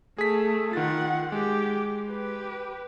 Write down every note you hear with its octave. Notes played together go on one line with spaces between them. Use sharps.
A3 G#4 B6
D#3 F4 F#5 A6
G#3 G4
G4 B4